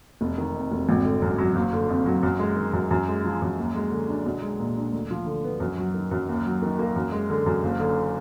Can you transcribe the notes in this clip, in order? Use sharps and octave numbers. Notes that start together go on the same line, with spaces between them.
F1
D#3
F2
F1
G#1
D3
F#2
F#3
F#1
D3
F2
F#3
F#2
G#3
D#3
F#2
F#2
G#3
F3
F#2
D#2
G#3
D3
D4
B1
G#3
A#2
D4
D2
F3
D3
B3
F#2
F#3
D#3
F#2
D#2
F#3
D#3
A#3
F#2
G#3
D3
F#2
F#1
D3